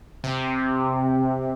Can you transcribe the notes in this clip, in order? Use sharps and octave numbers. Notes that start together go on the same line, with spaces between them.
C3